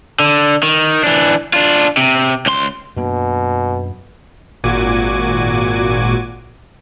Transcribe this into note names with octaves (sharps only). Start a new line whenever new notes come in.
D3
D#3
E3 D4
D4 F4
C3
C#2 C6
F#2 B2 A#3 D4
G#1 A#2 F#4 D6 G#6 D#7